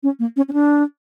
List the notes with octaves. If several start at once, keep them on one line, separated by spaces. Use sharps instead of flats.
C#4
A#3
C#4
C#4
D4